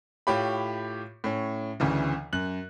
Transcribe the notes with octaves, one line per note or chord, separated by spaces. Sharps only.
A2 F4 G4 C#5 B5
A2 C#4
G1 D2 C#3 E3
F#2 F#6 F#7